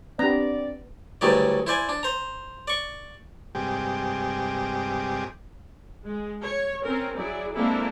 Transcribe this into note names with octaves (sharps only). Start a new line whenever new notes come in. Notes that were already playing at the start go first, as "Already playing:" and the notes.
B3 C4 D4 G4 D5 A#5
D2 G2 C#3 F#3 E4 D5
E4 C5 D5 G#5
D4
C5 A#5
D5 C#6
G2 C3 G#3 G4
G#3
C#5
C4 C#4 A#4
F#3 E4 G#4 D5
G#3 A#3 C4 D4 E4 A4